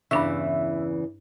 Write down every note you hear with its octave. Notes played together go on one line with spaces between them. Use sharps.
E2 G2 C#3 E3 D4 E5 C#6